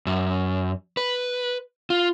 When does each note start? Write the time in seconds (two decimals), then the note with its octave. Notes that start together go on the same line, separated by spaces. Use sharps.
0.07 F#2
0.97 B4
1.90 F4